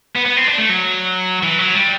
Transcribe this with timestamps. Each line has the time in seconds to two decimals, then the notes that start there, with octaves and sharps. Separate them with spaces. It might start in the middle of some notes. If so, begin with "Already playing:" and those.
0.16 B3
0.26 B3
0.37 C4
0.47 D4
0.58 A3
0.69 F#3
1.43 E3
1.59 F#3
1.75 G3